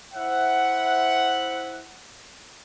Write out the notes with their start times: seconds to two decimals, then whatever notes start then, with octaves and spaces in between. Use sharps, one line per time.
0.14 E4 C5 E5 F#5